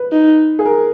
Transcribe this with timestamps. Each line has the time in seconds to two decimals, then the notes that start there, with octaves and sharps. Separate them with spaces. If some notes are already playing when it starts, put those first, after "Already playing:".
Already playing: B4
0.12 D#4
0.59 G#4
0.66 A#4